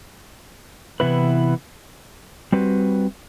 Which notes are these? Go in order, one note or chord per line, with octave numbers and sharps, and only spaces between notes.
C3 E3 B3 E4 B4
G3 C4 F#4 B4